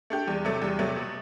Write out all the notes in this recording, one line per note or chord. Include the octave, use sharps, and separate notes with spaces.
A3 D4 G4
E2 G3
C3 F#3 A3
E2 G3
C3 F#3 A3
B2